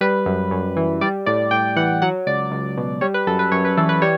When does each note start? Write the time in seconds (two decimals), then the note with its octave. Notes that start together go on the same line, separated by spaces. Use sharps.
0.01 G3 B4
0.26 F#2
0.51 F#2
0.76 E3
1.01 G3 D5
1.26 A2 D5
1.51 A2 G5
1.76 E3 F#5
2.02 F#3 F#5
2.27 C#2 D5
2.52 C#2
2.77 B2
3.01 G3 C#5
3.14 B4
3.27 F#2 A4
3.39 B4
3.52 F#2 C#5
3.65 B4
3.77 E3 A4
3.89 B4
4.02 G3 C#5